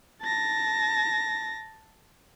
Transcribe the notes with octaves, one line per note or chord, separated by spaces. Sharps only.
A5 A#6